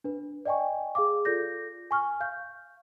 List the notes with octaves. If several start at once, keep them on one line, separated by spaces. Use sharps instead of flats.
D4 B4
D5 D#5 G5 G#5 C#6
G#4 F5 D6
F4 A4 D5 G6 A#6
G#5 C#6 F6
F5 G6